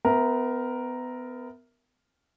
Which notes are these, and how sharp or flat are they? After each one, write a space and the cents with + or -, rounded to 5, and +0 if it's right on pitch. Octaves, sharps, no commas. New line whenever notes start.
B3 +30 A#4 +0 E5 +0